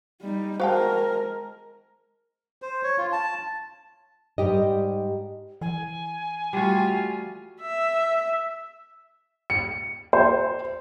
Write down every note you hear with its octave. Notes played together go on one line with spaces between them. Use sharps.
G3 D#4
G#3 F#4 A#4 C5 F5 G5 A5
C5
C#5
F4
A5
G#2 G3 G4 D#5
E3 G#5
G3 A3 F4 F#4
E5
C#7
C5